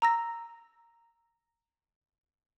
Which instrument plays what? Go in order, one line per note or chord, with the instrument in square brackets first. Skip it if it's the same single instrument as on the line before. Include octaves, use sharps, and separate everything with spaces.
[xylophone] A#5 E6 A#6